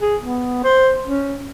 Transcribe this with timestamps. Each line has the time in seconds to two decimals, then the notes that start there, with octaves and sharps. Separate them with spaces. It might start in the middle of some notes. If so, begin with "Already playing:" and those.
0.02 G#4
0.22 B3
0.64 C5
1.07 C#4